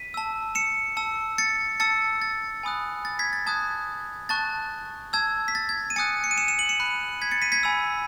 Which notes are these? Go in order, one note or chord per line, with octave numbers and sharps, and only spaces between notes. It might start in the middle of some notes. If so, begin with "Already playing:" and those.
Already playing: B6 D#7
A5 E6
C#7 E7
A5 E6
A6 C#7
A5 E6 A6 C#7
A6
G#5 B5 D#6 F#6
A6
G#6 B6
A6
A5 D#6 F#6 G#6
A5 C#6 F#6 A6
A5 E6 G#6
B6
A6
G#6
D#7
G#5 D#6 F#6 A6 C#7
C#7
D#7
C#7 E7
C#7 E7
D#7 F#7
C#7 E7
B5 F#6
G#6 B6
A6 C#7
B6 D#7
G#6 B6
G#5 B5 E6